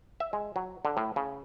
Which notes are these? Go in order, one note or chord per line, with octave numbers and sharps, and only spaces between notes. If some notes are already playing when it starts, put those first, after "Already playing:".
E5
G#3
F#3
D3
A2
C#3